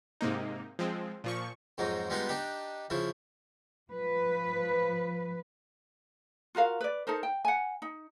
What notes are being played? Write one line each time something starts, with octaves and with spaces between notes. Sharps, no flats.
G#2 C3 A#3 D#4
F3 G#3 C4
A#2 F3 C#6
F2 G#2 F#3 D#4
G3 G#3 B3 D#4 F4 F#5
D4 D#4 G4
C#3 F3 E4
F3 B4
F4 F#4 A#4 F5
B4 D5
D#4 A4 A#4 C5
G5
F#5 G#5
D#4